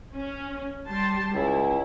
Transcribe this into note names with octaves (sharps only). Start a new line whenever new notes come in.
C#4
G3 A5 C6
C#2 E4